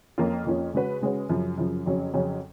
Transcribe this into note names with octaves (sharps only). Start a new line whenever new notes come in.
F2 F3 A#3 C#4 F4
F2 F3 A#3 C#4 F4
C#3 G#3 C#4 F#4 B4
C#3 G#3 C#4 F#4 B4
F#2 C#3 F3
F#2 C#3 F3
F2 C#3 F#3 C#4
F2 C#3 F#3 C#4